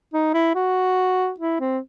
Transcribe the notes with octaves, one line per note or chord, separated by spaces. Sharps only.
D#4
E4
F#4
E4
C4